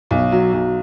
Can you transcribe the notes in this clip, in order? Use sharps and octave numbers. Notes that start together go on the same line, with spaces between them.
B1
F#3
B1